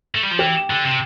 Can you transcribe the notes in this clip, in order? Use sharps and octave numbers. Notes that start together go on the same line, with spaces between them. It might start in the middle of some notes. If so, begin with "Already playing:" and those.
A3
G3
F3
E3 G4
D3
C3